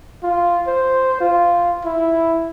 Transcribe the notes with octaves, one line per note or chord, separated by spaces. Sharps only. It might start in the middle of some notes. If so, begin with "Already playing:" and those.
F4
C5
F4
E4